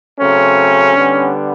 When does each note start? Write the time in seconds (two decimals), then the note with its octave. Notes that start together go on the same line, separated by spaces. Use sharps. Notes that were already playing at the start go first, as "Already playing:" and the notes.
0.20 C#3 F#3 A3 C4 C#4
0.95 D3 G3 B3